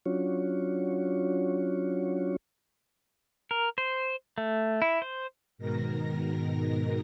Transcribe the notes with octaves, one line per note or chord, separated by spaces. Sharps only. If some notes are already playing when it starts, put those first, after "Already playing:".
F#3 C#4 D4 F4 F#4 C#5
A#4
C5
A3
E4
C5
G#2 B2 D#3 A#4 A#6